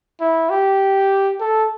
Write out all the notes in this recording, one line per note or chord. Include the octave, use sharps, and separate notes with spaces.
E4
G4
A4